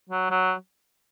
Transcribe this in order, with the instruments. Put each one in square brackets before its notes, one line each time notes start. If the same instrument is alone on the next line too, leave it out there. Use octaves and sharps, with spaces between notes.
[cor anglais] F#3
F#3